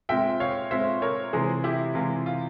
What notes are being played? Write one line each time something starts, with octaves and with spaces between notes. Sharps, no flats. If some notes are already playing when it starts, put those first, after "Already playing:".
A#2 G#3 C4 E5 G5
C#5 F5
A#2 G#3 C4 C5 E5
A#4 C#5
C3 E3 G#3 G#4 C5
E4 G4
C3 E3 G#3 F4
F4